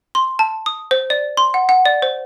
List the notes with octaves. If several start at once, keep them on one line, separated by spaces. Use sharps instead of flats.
C6
A5
D#6
C5
D5
C6
F#5
F#5
D5
C5